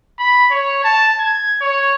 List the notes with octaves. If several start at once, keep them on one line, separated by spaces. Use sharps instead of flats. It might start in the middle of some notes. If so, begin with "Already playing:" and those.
B5
C#5
A5
G#6
C#5